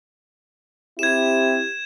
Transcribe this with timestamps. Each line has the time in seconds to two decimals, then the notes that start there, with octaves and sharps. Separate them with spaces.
0.99 C4 E4 G4 G#6 E7